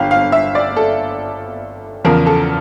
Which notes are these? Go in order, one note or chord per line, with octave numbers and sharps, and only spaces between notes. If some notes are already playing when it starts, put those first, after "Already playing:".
Already playing: G1 G2 F5 G5
F5
E5
D5
A4
E2 C#3 F3 A#4
A4